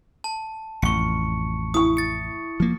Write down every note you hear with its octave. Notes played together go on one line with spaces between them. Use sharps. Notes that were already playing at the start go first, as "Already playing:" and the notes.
A5
A1 F2 C#6 C#7
E4 C#6 D#6
A6 C#7
F3 A#3